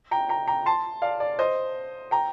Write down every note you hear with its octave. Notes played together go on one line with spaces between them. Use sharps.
G5 A#5
G5 A#5
G5 A#5
A5 C6
D5 F5
D5
C5 D#5
G5 A#5